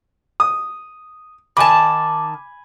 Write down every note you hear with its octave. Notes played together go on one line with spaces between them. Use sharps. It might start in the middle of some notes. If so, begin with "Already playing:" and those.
D#6
D#3 G#5 A5 B5 D6